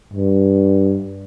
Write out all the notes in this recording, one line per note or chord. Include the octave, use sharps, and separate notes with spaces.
G2